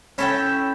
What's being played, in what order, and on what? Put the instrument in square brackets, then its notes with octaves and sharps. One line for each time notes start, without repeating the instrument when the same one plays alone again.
[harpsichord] C#4 [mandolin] E4 A4 E5 G5